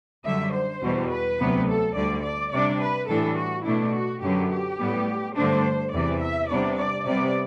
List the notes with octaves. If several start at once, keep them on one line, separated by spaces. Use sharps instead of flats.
F#2 D3 G3 E5
C5
E2 B2 G3
B4
D2 C3 F#3 B3
A4
D2 D3 G3 D5
D5
C3 G3 D4 D5
B4
A2 E3 G3 D4 A4
F#4
B2 A3 D4 E4
F#4
F#2 D3 F#3 B3 G4
G4
A2 G3 B3
G2 D3 A3 D4 C5
E2 C3 E3 D5
E5
C3 G3 B3 D4 D5
D5
C3 G3 B3 D5